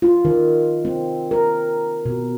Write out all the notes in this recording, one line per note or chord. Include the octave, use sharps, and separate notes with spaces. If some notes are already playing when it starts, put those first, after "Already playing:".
F4
D#3
C4
A#4
B2